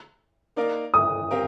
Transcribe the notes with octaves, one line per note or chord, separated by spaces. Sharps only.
A#3 D#4 A#4 D5 F5
D#6
C4 G4 A#4 F5